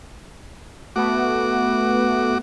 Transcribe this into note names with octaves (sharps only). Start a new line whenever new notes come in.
A3 B3 F#4 D6